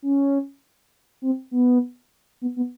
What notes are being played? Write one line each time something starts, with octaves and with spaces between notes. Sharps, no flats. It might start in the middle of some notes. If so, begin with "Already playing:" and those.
C#4
C4
B3
B3
B3